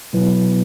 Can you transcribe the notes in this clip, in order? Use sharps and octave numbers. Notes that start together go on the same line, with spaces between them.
B2 F#3 B3 E4 B4